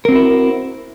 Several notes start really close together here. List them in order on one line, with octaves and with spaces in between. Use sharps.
A#4 C4 F#4 E4